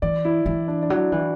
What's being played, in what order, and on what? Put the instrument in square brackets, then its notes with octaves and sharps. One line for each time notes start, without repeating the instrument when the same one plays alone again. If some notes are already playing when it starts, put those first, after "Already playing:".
[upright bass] E3 [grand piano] D5
[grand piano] E4
[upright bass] E3 [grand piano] E4
[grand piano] D4
D4
[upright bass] F#3 [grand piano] E4
[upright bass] E3
[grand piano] F#4